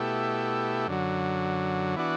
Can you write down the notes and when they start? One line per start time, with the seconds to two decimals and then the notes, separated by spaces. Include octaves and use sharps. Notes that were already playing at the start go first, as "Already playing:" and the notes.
Already playing: B2 A3 E4 G4
0.87 F#2 D3 F#3
1.96 E3 B3 D4 F#4